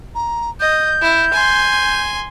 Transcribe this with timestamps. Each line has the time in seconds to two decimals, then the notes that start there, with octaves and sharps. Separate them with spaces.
0.15 A#5
0.60 D#5 G6
1.02 E4
1.33 G#5 C6